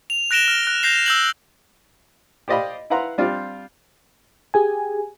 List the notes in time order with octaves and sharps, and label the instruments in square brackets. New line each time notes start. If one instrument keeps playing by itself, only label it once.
[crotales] F7
F#6 A#6 D7 E7 G7
F6 G7
F#6
G6 A#6 C7 F7
E6 G6 F#7
[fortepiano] G4 C5 D5 D#5 F5 B5
E4 B4 F5 F#5 A#5 C6
G3 C4 D4 F4 F5
[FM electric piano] G4 G#4 G#5